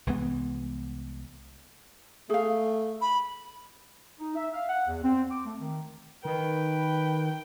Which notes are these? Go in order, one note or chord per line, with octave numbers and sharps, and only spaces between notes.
C2 E3 G#3 B3
A3 G#4 F5
B5
D#4
E5
F5
F#5
E2
C4
D6
A3
D#3
D#3 B4 G5